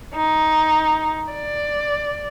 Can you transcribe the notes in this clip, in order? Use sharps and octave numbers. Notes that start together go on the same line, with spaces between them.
D#4
D5